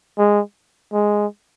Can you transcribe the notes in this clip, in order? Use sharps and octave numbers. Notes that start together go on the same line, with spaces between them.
G#3
G#3